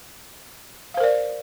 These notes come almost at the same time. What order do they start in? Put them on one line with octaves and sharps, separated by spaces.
F5 C5 A#4 D5